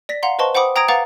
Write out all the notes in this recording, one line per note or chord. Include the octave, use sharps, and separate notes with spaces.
D5 A#6 B6
F5 F#5 A#5 C6
B4 C5 D#5 A5 C6 C#6
C5 F#5 G5 B5 D6 D#6
G5 A#5 D#6 G#6 A#6 D7
B4 F5 F#5 A#5 D6 A6